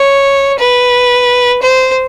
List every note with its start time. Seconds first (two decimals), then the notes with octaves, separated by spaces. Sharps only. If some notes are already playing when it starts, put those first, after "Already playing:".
Already playing: C#5
0.59 B4
1.62 C5